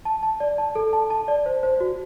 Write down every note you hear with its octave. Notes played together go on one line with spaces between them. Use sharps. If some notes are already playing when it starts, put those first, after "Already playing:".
A5
A5
D5
A5
A4
A5
A5
D5
C5
C5
F#4